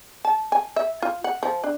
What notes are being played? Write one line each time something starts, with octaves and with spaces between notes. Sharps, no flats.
A5
G#5
E5
F4
F#5
F3
D4